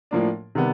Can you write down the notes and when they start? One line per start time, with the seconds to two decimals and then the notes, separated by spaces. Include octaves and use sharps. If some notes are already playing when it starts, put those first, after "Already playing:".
0.11 A2 F3 A#3 D4
0.55 C3 D#3 G3 B3